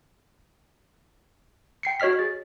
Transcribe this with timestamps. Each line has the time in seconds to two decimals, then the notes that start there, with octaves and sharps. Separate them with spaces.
1.83 G5 C7 C#7
2.00 F#4 C#5 D#5 F6 B6
2.19 G#4 A6